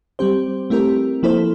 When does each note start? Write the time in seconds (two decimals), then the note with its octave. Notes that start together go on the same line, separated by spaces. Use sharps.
0.19 G3 C4 G4 C5
0.70 A3 C4 E4 G4 A#4
1.23 F3 A#3 E4 A4 C5